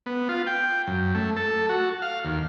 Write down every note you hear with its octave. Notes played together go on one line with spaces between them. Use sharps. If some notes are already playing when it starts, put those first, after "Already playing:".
B3
F4
G5
F#2
A3
A4
F#4
F5
D#2